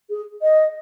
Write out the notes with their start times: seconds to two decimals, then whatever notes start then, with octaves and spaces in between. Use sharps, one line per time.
0.10 G#4
0.42 D#5